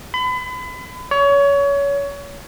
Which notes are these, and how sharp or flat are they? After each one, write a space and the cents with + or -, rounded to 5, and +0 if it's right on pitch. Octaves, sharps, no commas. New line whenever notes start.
B5 +35
C#5 +25